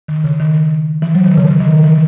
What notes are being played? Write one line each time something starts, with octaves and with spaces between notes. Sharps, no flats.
D#3
C#3
D#3
E3
F#3
D#3
C#3
C#3
D#3
D#3
E3